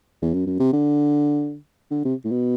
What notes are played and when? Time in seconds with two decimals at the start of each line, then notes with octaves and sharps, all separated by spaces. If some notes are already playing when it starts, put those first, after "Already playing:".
0.22 E2
0.34 F#2
0.47 F#2
0.60 C3
0.73 D3
1.91 D3
2.05 C3
2.25 A2
2.31 B2